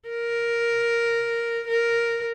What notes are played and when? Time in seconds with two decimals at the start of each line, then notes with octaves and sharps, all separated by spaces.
0.09 A#4
1.67 A#4